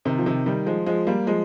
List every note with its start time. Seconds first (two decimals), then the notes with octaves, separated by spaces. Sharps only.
0.05 C3 D#3
0.18 F3
0.26 C3 D#3
0.46 D#3 G3
0.66 F3 G#3
0.86 F3 G#3
1.07 G3 A#3
1.27 F3 G#3